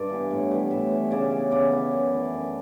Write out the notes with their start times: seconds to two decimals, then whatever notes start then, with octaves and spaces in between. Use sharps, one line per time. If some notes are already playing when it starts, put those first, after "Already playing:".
Already playing: G2 D5
0.10 E3 B3
0.31 A2
0.51 E3 G3
0.71 A2 E5
0.91 E3 G3
1.11 C#3 D5
1.31 E3 B3
1.51 C#3 D5
1.72 E3 B3
1.93 F#2
2.13 E3 A3
2.33 F#2